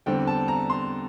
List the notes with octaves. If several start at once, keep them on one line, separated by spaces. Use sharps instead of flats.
E2 D3 G3 C4 G5
A5
A#5
C6